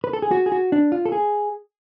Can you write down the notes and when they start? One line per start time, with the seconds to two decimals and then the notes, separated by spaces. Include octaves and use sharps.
0.04 B4
0.13 A4
0.22 G#4
0.31 F#4
0.46 G#4
0.52 F#4
0.72 D4
0.92 F4
1.05 A4
1.12 G#4